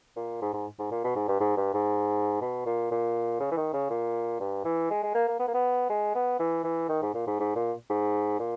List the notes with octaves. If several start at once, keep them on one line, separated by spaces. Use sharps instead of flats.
A#2
G#2
G#2
G#2
A#2
B2
G#2
G2
G#2
G2
G#2
B2
A#2
A#2
C#3
E3
D#3
C#3
A#2
G2
E3
G#3
G#3
A#3
A#3
B3
A#3
B3
G#3
B3
E3
E3
D#3
G#2
A#2
G#2
G#2
A#2
G#2
A#2